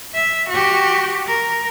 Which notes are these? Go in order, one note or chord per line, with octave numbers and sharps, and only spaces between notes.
E5
F#4 G4
A#4